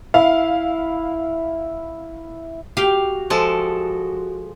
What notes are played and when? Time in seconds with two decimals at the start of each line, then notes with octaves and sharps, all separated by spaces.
0.14 E4 F5
2.77 F#4 G4 F5
3.30 F3 G#3 A4